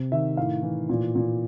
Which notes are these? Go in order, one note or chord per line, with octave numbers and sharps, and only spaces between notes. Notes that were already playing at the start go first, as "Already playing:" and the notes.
Already playing: C3
D#3 E5
A2 F5
E3
A#2
A#2